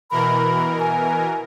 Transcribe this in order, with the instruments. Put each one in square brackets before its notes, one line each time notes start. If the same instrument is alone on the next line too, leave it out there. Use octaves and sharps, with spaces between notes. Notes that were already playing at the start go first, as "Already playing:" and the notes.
[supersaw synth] B2 E3 A#4 [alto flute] B5
[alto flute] G#5